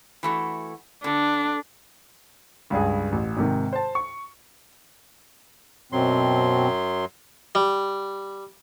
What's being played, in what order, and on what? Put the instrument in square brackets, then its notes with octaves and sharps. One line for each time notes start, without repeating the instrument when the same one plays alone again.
[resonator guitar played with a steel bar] E3 A3 F#4
[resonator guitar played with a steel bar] D3 [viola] D4
[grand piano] C#2 G2 G#4
A1
G#2 C3 D#3
C5 A5
C#6
[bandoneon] F#2 F#3 C6 [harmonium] B2 C4
[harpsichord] G3